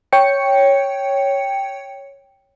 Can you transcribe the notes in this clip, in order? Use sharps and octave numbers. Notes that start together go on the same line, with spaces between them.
C#5 G5 C#7